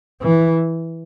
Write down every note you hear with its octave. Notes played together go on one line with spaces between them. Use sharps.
E3